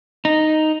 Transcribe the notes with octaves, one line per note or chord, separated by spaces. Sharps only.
D#4